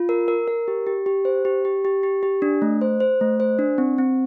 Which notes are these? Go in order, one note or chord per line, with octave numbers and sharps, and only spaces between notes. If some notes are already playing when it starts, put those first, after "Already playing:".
Already playing: F4
A#4
A#4
A#4
G4
G4
G4
C5
G4
G4
G4
G4
G4
D4
A3
C5
C5
A3
C5
D4
C4
C4